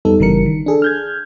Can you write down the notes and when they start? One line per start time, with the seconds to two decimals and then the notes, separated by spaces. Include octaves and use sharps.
0.05 F2 G3 B3 D#4 A4
0.19 G1 C#3 E3 G3 A#4 C#7
0.46 D#3
0.66 D4 G#4 A4
0.82 F6 G6 G#6